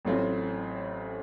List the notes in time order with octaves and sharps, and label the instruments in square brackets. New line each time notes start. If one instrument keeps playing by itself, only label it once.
[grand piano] A1 A2 F#3 C4 F4